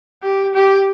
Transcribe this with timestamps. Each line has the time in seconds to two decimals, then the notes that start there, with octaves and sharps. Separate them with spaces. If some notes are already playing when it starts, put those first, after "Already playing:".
0.23 G4
0.54 G4